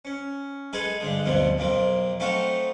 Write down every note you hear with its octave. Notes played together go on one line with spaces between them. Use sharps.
C#4
G#3 G#4 A4 B4 G#5
G2 D3 G#3
D2 G2 B2 F3 C4
B1 F2 A#3 C4
A3 C4 D#4 F4 F#4 A4